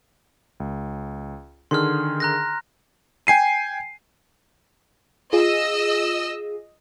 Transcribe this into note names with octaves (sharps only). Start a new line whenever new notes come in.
C#2
D3 D#3 G#4 C6 F6
A#5 F#6 A#6
G5 G#5 C7 D#7
F4 G#4 D#5 E6